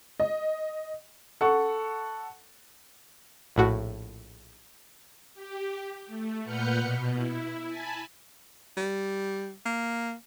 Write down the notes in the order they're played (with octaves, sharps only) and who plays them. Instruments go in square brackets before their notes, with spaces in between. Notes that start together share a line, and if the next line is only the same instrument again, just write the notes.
[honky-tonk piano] D#5
[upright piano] A4 F#5 C#6
[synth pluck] A#1 A2 F#4
[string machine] G4
A3
A#2 B4 F#5 F6 G6 C#7
B2
E4
G#5 A5 B5
[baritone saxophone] G3
A#3